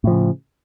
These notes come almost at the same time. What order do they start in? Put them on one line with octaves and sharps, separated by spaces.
A2 F3 C#3